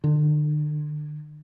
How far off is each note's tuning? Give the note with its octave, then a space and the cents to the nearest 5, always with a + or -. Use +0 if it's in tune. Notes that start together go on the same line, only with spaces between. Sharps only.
D3 +40